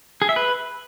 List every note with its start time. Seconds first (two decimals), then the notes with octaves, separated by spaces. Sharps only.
0.22 G#4
0.29 E5
0.36 B4